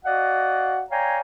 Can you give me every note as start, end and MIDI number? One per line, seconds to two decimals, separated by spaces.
0.05 0.82 66
0.05 0.82 74
0.05 0.82 75
0.05 0.82 77
0.05 0.82 78
0.91 1.20 73
0.91 1.20 74
0.91 1.20 77
0.91 1.20 79
0.91 1.20 80
0.91 1.20 82